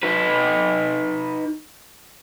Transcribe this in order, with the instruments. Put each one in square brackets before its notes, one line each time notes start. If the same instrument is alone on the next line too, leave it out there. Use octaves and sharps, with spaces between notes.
[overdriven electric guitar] D#4 B4